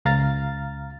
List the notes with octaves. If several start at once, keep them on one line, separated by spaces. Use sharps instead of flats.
C#2 F5 A#5 F6 A6